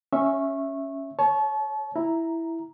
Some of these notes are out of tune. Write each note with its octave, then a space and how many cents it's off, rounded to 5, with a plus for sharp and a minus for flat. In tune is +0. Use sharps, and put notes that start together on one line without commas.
C#4 +0 E5 +0 C#6 -20
C#5 +0 A5 -35
E4 +0 A#5 +0